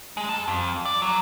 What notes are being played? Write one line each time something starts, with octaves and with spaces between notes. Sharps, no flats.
G#3
G#4 A5
F2
D5
F#3